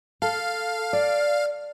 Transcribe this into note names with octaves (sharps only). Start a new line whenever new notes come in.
A4 F5
D5